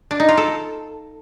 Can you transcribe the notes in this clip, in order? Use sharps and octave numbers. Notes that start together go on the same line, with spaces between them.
D4
D#4
F4
A4